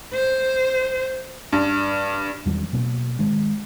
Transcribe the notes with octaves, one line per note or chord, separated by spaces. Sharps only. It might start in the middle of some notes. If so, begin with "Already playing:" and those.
C5
G2
E2 D#3 F#3 G3
B2 F#3 A#3
D#3 G#3